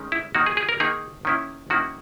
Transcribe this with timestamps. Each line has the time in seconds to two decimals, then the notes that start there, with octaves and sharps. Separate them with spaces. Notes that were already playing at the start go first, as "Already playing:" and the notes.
Already playing: D#3 G#3 C#4
0.12 E4
0.35 D#3 A#3 D#4 F#4
0.46 G#4
0.57 G#4
0.69 A#4
0.80 D#3 A#3 D#4 G#4
1.25 D#3 A#3 C#4 E4
1.70 D#3 A#3 C#4 E4 F#4